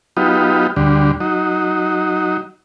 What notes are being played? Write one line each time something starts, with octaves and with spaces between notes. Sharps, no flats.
F#3 B3 D#4 F4 G4
D2 D3 G3
F#3 D#4